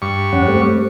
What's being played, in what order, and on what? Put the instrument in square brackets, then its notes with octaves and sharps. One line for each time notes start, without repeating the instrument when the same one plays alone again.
[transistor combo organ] G2 C#6
[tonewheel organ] F2 C#4 F#5
G3 A3 C4